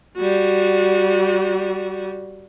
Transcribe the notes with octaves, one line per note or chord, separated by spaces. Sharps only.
G3 F#4